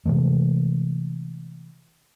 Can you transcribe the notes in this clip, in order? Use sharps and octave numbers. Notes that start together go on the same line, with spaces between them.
C3 E3 G#3 A3